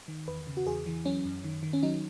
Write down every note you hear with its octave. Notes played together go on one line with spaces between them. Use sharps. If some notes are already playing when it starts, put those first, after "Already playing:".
D#3
E2 B4
C#3
F#4
E2 G#4
E3
F#3 C#4
F#2
D#3
D#3
C#4
F#3 D#4